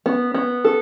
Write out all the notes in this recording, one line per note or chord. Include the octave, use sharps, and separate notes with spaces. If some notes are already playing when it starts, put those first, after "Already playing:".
B3
B3
A4